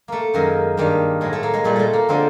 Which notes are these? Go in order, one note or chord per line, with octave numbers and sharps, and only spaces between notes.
A3 A#3
F#2 D#3 G#3 A#3
G2 D#3 G3 A#3
A2 F#3 G#3
A3
A#3
G#3
A#2 G3 A3
G#3 A3
A#3
D3 F3 G#3 C4